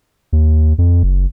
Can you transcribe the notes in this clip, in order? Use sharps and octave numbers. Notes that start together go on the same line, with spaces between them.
D#2
F2
F#1